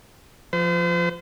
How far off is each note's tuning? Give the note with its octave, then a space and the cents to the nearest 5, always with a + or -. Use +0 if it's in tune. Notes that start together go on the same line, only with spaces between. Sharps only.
F3 +0 C5 -40